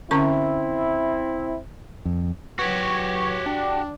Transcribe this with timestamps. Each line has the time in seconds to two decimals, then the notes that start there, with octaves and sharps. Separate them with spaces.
0.11 D3 C4 C#4 E4 C#6
2.05 F2
2.59 F#3 F#4 G4 B4 C#5
3.46 D4 G5